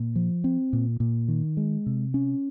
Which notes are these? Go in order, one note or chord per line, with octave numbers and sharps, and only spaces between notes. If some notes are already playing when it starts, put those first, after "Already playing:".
Already playing: A#2
F3
C4
A#2
A#2
D#3
G#3
C3
C#4